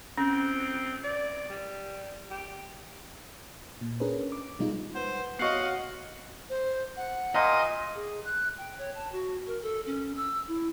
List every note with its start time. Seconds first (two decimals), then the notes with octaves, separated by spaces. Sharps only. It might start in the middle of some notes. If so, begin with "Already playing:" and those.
0.18 C4 C#4
1.03 D5
1.50 G3
2.31 G4
3.81 A#2
4.00 C#4 D4 G#4 A#4 B4
4.32 D6
4.59 B2 G3 G#3 D#4 F4
4.95 B4 C5 F#5
5.39 B3 F#4 C#5 D#5 F5 F#5 C#6 C7
6.50 C5
6.97 F#5
7.35 A#2 D#5
7.95 G#4
8.24 F#6
8.58 G5
8.78 C#5
8.94 A5
9.12 F#4
9.47 A#4
9.62 A4
9.86 C#4
10.16 E6
10.48 E4